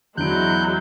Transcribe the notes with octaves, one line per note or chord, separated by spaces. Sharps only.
E2 F#3 G#3 D4 E4 F#6 G6 D7